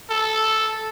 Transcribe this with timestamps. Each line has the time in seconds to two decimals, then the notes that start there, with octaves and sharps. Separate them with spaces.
0.10 A4